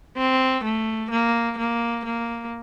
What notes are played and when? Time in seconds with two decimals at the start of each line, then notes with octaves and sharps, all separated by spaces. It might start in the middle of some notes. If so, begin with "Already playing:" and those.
0.17 C4
0.63 A3
1.10 A#3
1.58 A#3
2.05 A#3